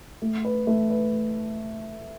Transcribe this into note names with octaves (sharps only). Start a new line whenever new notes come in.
A3
B4
A3
B4